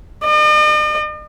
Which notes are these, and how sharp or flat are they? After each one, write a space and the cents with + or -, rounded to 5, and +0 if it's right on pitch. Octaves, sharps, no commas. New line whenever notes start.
D#5 -45